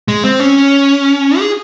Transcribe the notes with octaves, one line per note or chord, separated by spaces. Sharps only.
G#3
C4
C#4
G#4